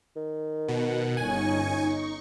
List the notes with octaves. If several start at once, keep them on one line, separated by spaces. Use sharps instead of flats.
D#3
B2 F#5
G1 C#4 D#4 G#5 C#6